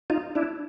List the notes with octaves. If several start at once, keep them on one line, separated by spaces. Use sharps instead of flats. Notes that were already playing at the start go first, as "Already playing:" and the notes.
D#4 F4
D4 E4